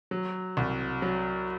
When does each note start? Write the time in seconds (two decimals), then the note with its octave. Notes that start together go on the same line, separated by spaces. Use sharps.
0.11 F#3
0.57 C2
1.02 F#3